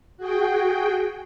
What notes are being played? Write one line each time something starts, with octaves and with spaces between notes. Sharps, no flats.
F#4 G#4 G5